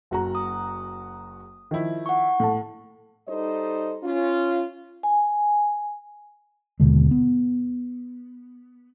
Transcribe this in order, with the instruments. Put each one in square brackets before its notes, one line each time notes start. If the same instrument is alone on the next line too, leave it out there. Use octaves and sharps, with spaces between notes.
[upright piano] F#1 F#4 A#5
[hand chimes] D#6
[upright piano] D#3 F3 E4
[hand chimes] F#5 C#6
[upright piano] A2 A5
[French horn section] G3 D#4 A4 C5 D#5
C#4 F4
[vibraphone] G#5
[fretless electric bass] D#2 B2 D3 G#3
B3